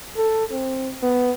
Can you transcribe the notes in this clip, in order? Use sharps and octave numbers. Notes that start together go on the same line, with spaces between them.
A4
C4
B3